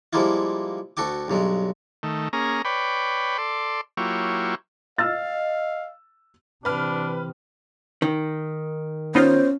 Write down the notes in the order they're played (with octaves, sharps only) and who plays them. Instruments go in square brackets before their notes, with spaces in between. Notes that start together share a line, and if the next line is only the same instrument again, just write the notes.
[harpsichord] F3 G3 G#3 A#3 E4 F4
D2 F#4 A4 G5 D6
B1 G2 F#3 G#3
[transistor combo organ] D#3 A3
A#3 C#4 G#4 A#5
B4 C#5 D5 G5 B5
A4 D5 C6
F#3 A#3 E4 F4 G4 C#5
[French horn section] D#5 [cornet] F5 [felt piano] E6 F6 A6
[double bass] C3 E3 [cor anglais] D4 [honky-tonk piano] B4 F6
[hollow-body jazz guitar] D#3
[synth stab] B3 D#4 F4 [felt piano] C#4 [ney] C5